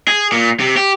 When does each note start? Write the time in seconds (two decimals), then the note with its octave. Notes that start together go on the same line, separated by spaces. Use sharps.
0.08 G#4
0.32 A#2
0.60 C3
0.77 G4